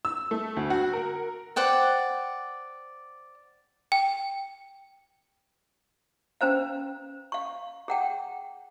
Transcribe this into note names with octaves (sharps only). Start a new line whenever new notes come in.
E6
A3
D2
F#4
A#4
C5 D5 F#5 G5
G5
C#4 B4 C5 F5
F5 C#6
G#4 F#5 G5